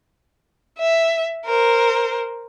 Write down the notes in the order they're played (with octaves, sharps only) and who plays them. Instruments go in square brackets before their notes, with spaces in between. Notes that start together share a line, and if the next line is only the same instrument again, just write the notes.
[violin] E5
A#4 C5